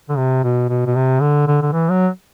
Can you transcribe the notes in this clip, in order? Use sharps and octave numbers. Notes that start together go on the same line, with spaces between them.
D3
C3
B2
B2
B2
C3
D3
D3
D3
E3
F#3